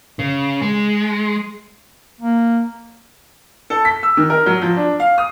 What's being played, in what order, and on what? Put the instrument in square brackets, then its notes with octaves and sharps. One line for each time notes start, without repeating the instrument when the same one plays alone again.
[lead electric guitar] C#3
G#3
[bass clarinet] A#3
[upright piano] A4
B6
E6
D#3
A#4
F#3
F3
D4
F5
D#6